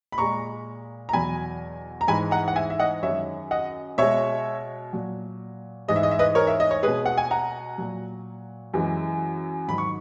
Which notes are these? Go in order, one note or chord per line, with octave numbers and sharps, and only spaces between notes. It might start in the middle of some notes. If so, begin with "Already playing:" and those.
B5
A#2 G#3 A#5 C#6
A#5
E2 B2 F#3 G#5 B5
A#5
G#2 E3 G#3 G#5 B5
F#5 A#5
F#5
E5 G#5
E5
D#5 F#5
F#2 D#3 G#3 C#5 E5
D#5 F#5
B2 G#3 C#5 E5
A#2 F#3
G#2 E3 G#3 D#5
E5
D#5
E5
B4 D#5
A#4 C#5
E5
D#5
C#5
B2 G#3 G#4 B4
F#5
G#5
F#5 A#5
A#2 F#3
F#2 E3 G#3
G#2 D#3 F#3 B5
C#6